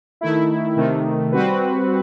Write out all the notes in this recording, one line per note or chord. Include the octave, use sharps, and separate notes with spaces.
D#3 A3 E4
C3 D#3 A3
G3 C4 F#4 B4